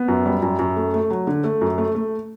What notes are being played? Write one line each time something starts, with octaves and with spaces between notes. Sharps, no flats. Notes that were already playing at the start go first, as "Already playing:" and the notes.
Already playing: B3
F#2
G3
F#2
F#2
A3
A3
F#3
D3
A3
F#2
A3
A3